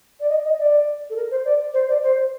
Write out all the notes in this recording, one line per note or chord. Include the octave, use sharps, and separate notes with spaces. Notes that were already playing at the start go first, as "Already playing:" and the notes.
D5
D#5
D#5
D5
A4
A#4
C5
D5
C5
D5
C5